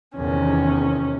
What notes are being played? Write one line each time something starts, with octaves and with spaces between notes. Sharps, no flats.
E2 C3 D#3 C#4